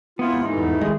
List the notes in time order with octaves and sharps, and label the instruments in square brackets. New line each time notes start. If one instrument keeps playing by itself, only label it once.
[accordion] D#2 F4 [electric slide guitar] B3 E4
[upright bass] G#2
[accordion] G2 E3 A3 [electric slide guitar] D#4
[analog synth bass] E2
[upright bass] D#3 [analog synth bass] G#3